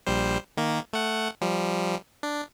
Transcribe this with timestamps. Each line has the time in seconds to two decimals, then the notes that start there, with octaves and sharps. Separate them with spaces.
0.07 A#1 G3 C5
0.57 D#3 A#3
0.93 A3 F#5
1.41 F3 G3
2.23 D4